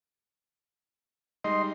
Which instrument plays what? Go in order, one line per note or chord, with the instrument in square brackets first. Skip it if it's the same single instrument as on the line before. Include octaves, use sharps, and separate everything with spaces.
[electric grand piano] G3 G#3 D#4 [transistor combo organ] D#5 C6